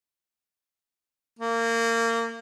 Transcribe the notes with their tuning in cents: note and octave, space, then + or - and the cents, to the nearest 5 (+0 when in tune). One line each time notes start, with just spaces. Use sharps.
A#3 -25